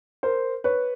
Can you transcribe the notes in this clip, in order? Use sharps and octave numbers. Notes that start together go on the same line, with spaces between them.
A#4 C5
B4 C#5